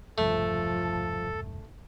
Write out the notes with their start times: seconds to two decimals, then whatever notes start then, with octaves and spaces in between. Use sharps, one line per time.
0.18 E1 C2 G2 F3 A3 A4